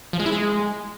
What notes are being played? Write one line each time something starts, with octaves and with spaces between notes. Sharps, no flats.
F3
G#3
E4
G#3